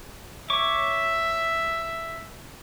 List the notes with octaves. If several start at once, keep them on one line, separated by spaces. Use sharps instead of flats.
C#5 E5 C#6 D6